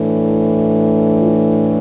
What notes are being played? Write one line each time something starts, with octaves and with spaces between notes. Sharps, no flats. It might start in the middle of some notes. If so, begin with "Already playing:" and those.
Already playing: A2 E3 A3 D4
F4